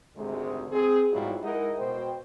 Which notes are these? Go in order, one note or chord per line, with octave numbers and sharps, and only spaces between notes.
G#1 D2 C3 G#3
C4 G#4
G#2 B2 F#3 G3 E4 F4
G#3 D#4 E4 A#4 D#5 F#5
B2 C5 G5